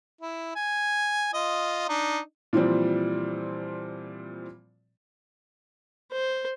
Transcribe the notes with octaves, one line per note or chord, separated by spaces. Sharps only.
E4
G#5
F4 D#5
D4 D#4
A#2 E3 F3 G3 C4
C5